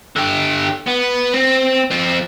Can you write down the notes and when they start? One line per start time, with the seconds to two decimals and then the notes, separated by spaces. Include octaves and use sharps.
0.16 D3 G4
0.88 B3
1.34 C4
1.91 F3 C4